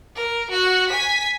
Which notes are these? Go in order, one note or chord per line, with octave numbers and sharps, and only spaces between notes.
A#4
F#4 F#5
G#5 B6